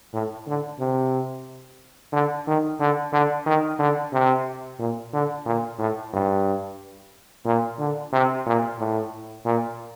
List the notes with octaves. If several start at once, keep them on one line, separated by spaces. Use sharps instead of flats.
A2
D3
C3
D3
D#3
D3
D3
D#3
D3
C3
A#2
D3
A#2
A2
G2
A#2
D3
C3
A#2
A2
A#2